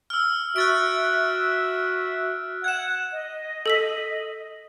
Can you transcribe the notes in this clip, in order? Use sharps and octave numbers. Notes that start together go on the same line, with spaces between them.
E6 F6
F#4 E5 F#6 A6 D7
F#5 G#6 E7
D#5
A4 E6 B6